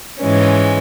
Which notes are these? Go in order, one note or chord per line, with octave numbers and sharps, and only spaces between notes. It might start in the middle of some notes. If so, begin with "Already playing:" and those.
G#2 E3 G#3 C#4